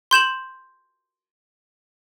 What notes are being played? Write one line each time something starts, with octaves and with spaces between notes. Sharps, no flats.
C6 G6 E7 F#7